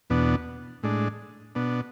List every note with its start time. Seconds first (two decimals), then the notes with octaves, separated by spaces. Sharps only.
0.10 E2 B2 B3 D4
0.83 A2 G#3 D4
1.55 B2 B3 D4